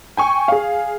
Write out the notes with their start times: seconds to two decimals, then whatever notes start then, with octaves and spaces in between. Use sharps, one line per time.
0.17 G5 G#5 C#6
0.48 G#4 F5